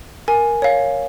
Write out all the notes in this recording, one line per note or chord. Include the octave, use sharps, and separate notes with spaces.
A#4 G#5
C#5 F5